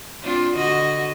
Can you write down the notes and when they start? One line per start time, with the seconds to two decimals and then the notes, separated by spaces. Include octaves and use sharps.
0.21 C4 D4 F4
0.56 D3 F#4 D#5